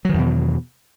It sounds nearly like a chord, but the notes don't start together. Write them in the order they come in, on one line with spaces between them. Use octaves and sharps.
F#3 D#3 E2 B2